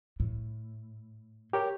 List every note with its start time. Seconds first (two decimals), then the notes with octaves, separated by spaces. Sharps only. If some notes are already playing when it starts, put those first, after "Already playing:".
0.20 A2
1.53 G4 A#4 C#5